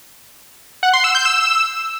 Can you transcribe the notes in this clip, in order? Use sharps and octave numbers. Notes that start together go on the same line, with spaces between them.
F#5
C6
E6
G6
E6